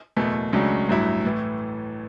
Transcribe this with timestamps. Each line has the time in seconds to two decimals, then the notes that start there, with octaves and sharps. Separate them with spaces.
0.16 F#1 E2 B2 A3
0.53 C#2 C#3 F#3 A3 D4
0.89 A1 G2 F#3 A3 E4
1.25 A2 E3 A3